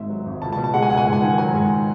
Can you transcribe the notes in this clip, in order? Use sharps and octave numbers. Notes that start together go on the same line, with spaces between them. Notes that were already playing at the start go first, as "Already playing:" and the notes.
Already playing: G#1 G#2 E5
F#3
G#1
C#2 A5
A5
B2
A5
G#3 F#5
G#5
C#2 F#5
G#5
G#2 F#5
G#5
D#3 F#5
F#3 G#5
G#2